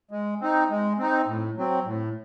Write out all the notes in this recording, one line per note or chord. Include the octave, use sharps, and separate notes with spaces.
G#3
C4 D#4
G#3
C4 D#4
A2
F#3 C4
A2